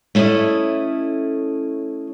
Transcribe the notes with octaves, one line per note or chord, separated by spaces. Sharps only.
A3 C#4 E4 A4 D#5